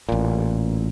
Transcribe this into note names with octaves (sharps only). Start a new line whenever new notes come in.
A1 A#2